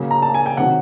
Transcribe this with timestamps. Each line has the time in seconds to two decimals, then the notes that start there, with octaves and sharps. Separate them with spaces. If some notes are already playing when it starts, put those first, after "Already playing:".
Already playing: C#3 F#3 A#3
0.11 A#5
0.22 A5
0.34 G#5
0.46 G5
0.57 C3 D#3 F#3 F#5